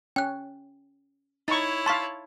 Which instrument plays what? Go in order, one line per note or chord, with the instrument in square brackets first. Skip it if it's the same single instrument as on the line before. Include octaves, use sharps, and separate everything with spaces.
[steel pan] C#4 [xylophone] G5 F#6
[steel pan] D#4 C#6 [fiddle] E4 C#5 [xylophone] A6
[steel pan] F5 A5 [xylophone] C6 C#6 B6